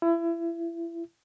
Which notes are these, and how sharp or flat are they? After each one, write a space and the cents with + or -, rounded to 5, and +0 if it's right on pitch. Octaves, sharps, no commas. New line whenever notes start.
E4 +30